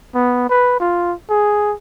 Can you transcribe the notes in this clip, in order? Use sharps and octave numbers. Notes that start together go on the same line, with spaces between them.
B3
B4
F4
G#4